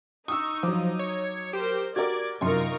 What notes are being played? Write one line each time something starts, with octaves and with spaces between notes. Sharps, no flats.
D#4 C#6 D#6 E6
F3 F#3 D6
C#5
G4 A#4 C5
F#4 G4 A#4 D5 G#6
F#2 C3 D#4 F4 A#4 C6 C#6